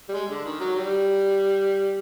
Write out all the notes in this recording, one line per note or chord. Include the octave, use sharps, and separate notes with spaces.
G3
G#3
D3
D#3
F#3
G3